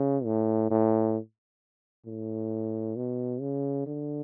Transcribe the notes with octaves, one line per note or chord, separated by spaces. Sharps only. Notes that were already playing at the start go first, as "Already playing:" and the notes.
Already playing: C#3
A2
A2
A2
B2
C#3
D3